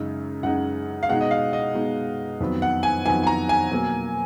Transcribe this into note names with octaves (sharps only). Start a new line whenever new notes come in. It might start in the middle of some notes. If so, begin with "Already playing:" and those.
Already playing: F#2 C#3 G#3 D#4
F#2 C#3 G#3 D#4 F#5
F5
B2 G#3 D#4 F#5
D#5
F5
D#5
B2 G#3 D#4
F2 D#3 F#3 B3
F#5
G#5
F2 D#3 F#3 B3 G#5
G#5
A#5
G#5
B2 F#3 A#3